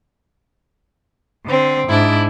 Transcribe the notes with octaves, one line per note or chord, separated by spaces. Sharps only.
D3 C4
G#2 D4 E4